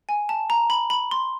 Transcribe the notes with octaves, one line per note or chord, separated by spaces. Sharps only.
G#5
A5
A#5
B5
B5
C6